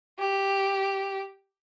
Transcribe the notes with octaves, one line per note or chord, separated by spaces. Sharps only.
G4